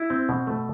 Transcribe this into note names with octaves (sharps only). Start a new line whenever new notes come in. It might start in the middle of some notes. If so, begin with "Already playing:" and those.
Already playing: E4
C4
B2
A3